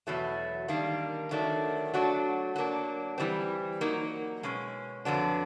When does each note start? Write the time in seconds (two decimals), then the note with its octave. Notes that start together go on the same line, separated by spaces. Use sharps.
0.07 E2 B2 F#3 A3
0.68 D#3 G3 A#3 D4
1.31 D#3 F#3 A3 D4
1.94 F#3 A3 D4 F#4
2.56 F#3 A#3 D4
3.18 E3 G3 C4
3.81 F#3 A#3 D#4
4.43 B2 G#3 C#4
5.05 F2 D3 F#3 B3 D4